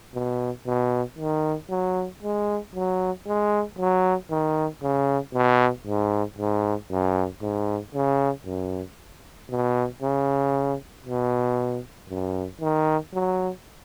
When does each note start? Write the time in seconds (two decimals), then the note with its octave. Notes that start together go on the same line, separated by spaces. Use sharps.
0.15 B2
0.66 B2
1.19 D#3
1.70 F#3
2.23 G#3
2.75 F#3
3.27 G#3
3.79 F#3
4.30 D#3
4.82 C#3
5.34 B2
5.87 G#2
6.38 G#2
6.91 F#2
7.42 G#2
7.94 C#3
8.46 F#2
9.50 B2
10.02 C#3
11.06 B2
12.10 F#2
12.61 D#3
13.14 F#3